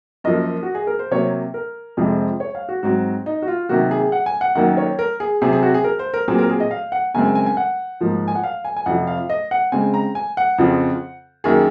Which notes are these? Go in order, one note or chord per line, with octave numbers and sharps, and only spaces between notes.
F#2 F3 A#3 D#5
F#4
G#4
A#4
C5
C3 F#3 A#3 C#5
A#4
F2 C3 F3 G#3 C4
C#5
F5
F#4
G#2 F#3 C4 F#4
D#4
F#4
F4
C3 D#3 F#3 A#3 F#4
G#4
F#5
G#5
F#5
F#2 D#3 F#3 A#3 F#5
C#5
A#4
G#4
C3 F#3 C4 G#4
G#4
F#4
G#4
A#4
C5
A#4
A#2 F#3 C4 G#4
A#4
G#4
D#5
F5
F#5
F#2 C#3 G#3 C4 G#5
G#5
G#5
G#5
F#5
G#2 F3 A#3
G#5
F#5
F5
G#5
G#5
F2 C3 F3 F#5
F5
D#5
F#5
C#3 G#3 C4 G#5
A#5
G#5
F#5
F2 C#3 F3 C4
F#2 D#3 A#3 G#4